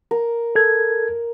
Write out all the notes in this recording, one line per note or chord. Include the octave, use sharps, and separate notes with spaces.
A#4
A4 G#6